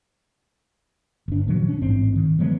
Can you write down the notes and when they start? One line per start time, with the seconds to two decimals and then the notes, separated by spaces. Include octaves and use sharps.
1.28 G1 D4
1.48 A#2 D#3 F3 F#3
1.68 C#4 D4
1.81 A1 G#2 C4
2.16 D#3
2.39 E3 F#3 G#3 B3